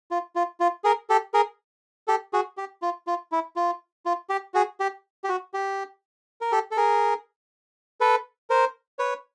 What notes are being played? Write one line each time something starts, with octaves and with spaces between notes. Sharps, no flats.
F4
F4
F4
G#4 A#4
G4 A4
G#4 A#4
G4 A4
F#4 G#4
G4
F4
F4
E4
F4
F4
G4
F#4 G#4
G4
G4
F#4
G4
A#4
G4 A4
A4
G#4 A#4
A4 B4
A#4 C5
B4 C#5